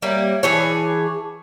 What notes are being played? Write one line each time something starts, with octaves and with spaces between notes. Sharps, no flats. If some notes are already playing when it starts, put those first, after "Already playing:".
G3 A#3 C#5 E5
E3 G#4 C#5 A5 D6